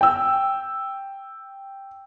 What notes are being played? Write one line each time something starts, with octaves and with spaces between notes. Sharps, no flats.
G5 E6